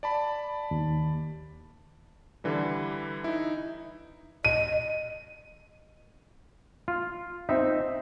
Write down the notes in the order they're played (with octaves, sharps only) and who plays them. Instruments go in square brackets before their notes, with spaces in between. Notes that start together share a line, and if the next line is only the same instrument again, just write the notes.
[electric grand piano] D5 A5 B5
[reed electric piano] D#2
[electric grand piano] D3 E3 G3
D#4 E4
[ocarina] D#5 [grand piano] D#7
[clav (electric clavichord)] F4
[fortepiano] C4 E5 [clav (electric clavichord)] D#4